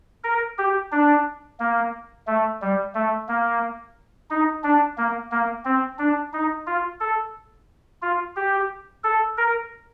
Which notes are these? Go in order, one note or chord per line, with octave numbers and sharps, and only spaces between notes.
A#4
G4
D4
A#3
A3
G3
A3
A#3
D#4
D4
A#3
A#3
C4
D4
D#4
F4
A4
F4
G4
A4
A#4